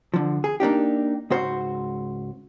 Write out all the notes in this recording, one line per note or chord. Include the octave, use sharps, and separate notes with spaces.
D3 F3
G#4
A#3 D4 D#4 G4
C#2 G#2 F#4 C5